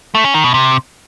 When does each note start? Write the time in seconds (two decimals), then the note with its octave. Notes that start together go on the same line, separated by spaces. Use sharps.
0.15 A3
0.24 C#4
0.34 D#3
0.44 B2
0.54 C3